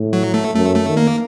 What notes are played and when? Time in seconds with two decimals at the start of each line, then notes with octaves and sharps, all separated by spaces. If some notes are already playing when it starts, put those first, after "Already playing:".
Already playing: A2
0.13 F#3
0.34 A3
0.55 F#2 A3
0.76 A3
0.87 D#3
0.97 A#3